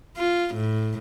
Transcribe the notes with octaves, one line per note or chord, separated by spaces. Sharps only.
F4
A2